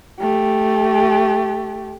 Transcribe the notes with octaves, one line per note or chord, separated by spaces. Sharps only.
A3 G4